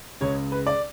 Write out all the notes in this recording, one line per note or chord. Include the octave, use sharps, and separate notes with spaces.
C#2 C#3 G#3 C#5
B4
D5